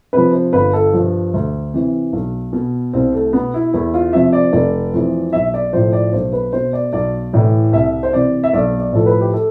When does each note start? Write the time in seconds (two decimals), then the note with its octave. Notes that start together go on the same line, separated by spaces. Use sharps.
0.13 C3 F3 B4
0.33 C5
0.53 G1 B4
0.73 A4
0.93 G2 F3
1.34 D2
1.74 C3 E3
2.13 B1
2.53 B2
2.93 C2 C4
3.13 A3
3.33 B2 B3
3.54 E4
3.73 E2 E4
3.94 F4
4.13 C3 F3 E5
4.33 D5
4.53 F1 D5
4.94 F2 E3
5.33 B1 E5
5.54 D5
5.73 A2 F3 C5
5.93 D5
6.13 B1 C5
6.33 B4
6.53 B2 C5
6.73 D5
6.93 B1 D5
7.33 A2 E3
7.73 C2 E5
8.03 C5
8.13 C3 E3 D5
8.44 E5
8.53 B1 D5
8.80 D5
8.93 A2 F3 A4
9.06 B4
9.21 G4
9.33 A4